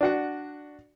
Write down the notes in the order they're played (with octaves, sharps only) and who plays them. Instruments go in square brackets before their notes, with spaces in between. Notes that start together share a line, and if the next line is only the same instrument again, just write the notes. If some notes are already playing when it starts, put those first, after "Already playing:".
[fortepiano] D4 F#4 F#5